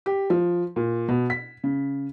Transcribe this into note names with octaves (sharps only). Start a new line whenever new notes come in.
G4
F3
A#2
B2
B6
C#3